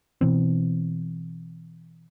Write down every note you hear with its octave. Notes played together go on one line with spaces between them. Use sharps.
B2 E3 C4